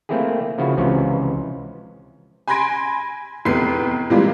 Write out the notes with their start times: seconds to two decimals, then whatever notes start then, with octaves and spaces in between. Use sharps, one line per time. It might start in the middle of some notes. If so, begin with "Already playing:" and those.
0.09 A3 A#3 C4 E4 G4 G#4
0.58 C#3 F3 E4 F#4
0.77 C#2 C3 E3 F3 C#4
2.48 G#5 B5 C6 G#6 A#6 D7
3.45 F1 E2 B4 C7
4.10 C3 E3 F3 G3 G#3 A#3